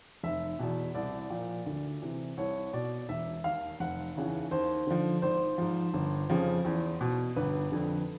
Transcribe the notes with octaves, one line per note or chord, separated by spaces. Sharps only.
F1 E5
E2 B2
C2 D5
A#2 F3
D2
C3 E3
C2 C#5
B2 D5
E1 E5
D#2 D#3 F5
F1 F#5
D#2 C#3 E3
D#2 C5
D3 F3
G#1 C5
G#2 F3
G1
F2 C#3 F3
E2
B2
G1 B4
F2 D3